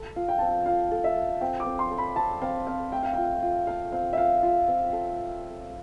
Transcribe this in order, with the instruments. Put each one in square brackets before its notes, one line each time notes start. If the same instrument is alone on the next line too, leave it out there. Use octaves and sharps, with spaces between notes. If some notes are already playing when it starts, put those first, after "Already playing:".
Already playing: [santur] A4
F4
[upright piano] G5
[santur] C4 [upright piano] A5
[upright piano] G5
[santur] F4 [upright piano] F5
[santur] A4
[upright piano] E5
[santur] A4
[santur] C4 [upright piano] G5
[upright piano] D6
[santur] C4
[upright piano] C6
[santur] A4
[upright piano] B5
[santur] C4 [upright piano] A5
[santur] C4 [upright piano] F5
[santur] C4 [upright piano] F5
[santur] A3 [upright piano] G5
[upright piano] F5
[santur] F4 [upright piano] G5
[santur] F4
[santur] A4 [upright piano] F5
[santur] C4 [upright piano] F5
[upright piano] E5
[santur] F4 [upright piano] F5
[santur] F4
C4
A4